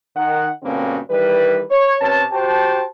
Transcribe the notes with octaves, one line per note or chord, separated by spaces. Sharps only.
D#3 F#5
G2 B2 D3 A#3 C4 C#4
D#3 E3 G3 B4
C#5
C3 C#4 B4 C#5 A5
F#4 G4 C5 G5 A5